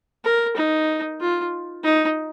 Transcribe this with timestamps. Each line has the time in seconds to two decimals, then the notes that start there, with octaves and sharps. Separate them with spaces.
0.24 A#4
0.56 D#4
1.21 F4
1.84 D#4